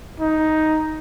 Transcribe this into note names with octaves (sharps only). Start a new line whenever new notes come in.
D#4